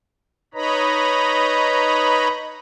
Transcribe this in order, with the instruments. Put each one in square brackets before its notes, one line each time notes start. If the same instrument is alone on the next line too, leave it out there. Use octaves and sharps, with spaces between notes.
[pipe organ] D#4 B4 C#5 D#5 A#5 B5